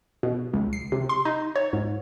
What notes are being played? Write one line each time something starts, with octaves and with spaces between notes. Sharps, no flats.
B2
C#2
C7
C3
C6
D#4
C#5
G#2